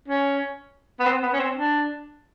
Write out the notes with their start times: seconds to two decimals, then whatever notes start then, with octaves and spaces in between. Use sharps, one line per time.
0.08 C#4
1.00 B3
1.06 C4
1.23 B3
1.34 C#4
1.40 C4
1.56 D4